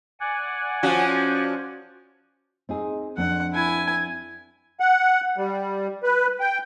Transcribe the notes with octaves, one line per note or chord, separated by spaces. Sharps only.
D5 F#5 G#5
F3 C#4 F#4
C4 D#4 G#4
F2 C4 D4 F#5
E4 G#5
F#5
G3
B4
G5